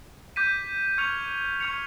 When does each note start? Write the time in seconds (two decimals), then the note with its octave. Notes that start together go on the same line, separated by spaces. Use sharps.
0.36 D6 G6 B6 D#7
0.98 C#6 F6 G#6 C#7 F7
1.60 C#6 F6 G#6 C#7 F7